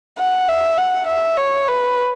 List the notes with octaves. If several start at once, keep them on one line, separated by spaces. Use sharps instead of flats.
F#5
E5
F#5
E5
C#5
B4